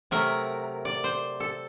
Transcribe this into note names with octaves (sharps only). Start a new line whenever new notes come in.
C3 F#3 A3 A#4
D5
C5
A4